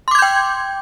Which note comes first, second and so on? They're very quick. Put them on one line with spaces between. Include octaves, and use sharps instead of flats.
C6 D6 G#6 G6 G5